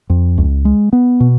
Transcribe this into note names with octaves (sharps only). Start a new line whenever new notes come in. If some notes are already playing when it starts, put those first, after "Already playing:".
F2
C#2
G#3
B3
B2